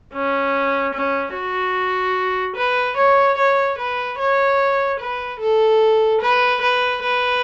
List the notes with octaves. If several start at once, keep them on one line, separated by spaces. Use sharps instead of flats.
C#4
C#4
F#4
B4
C#5
C#5
B4
C#5
B4
A4
B4
B4
B4